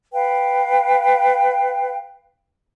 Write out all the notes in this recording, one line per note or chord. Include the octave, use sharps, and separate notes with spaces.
B4 F5 G5